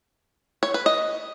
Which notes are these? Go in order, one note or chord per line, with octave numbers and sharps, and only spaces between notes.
C#5
B4
D#5